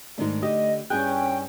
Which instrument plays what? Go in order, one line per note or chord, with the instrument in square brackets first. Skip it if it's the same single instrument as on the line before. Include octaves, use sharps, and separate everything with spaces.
[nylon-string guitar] G#2 D#3 D4 [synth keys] A3 D#4
[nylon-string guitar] D3 G4 [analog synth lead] D#5
[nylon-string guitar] G2 E4 G#4 [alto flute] C#4 [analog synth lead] G5 [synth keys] F#6